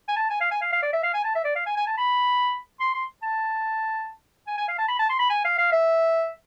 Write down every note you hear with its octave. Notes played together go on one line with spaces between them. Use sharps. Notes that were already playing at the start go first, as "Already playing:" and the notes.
G#5
A5
G#5
F5
G#5
F5
F5
D5
E5
F5
G#5
A5
E5
D5
F5
G#5
G#5
A5
B5
C6
C6
A5
G#5
G#5
F5
A5
B5
A5
C6
B5
G#5
F5
F5
E5